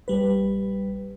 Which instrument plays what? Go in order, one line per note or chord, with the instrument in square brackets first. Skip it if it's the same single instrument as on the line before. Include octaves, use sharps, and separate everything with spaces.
[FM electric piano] A#1 G3 B4